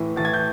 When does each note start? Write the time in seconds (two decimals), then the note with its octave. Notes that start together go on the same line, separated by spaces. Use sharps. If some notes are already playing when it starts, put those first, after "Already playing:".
Already playing: A2 E3
0.16 A2 E3 A6
0.25 G#6
0.34 G6